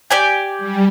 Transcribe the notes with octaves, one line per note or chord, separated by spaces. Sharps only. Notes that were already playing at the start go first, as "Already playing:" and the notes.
G4 D5 G#5
G3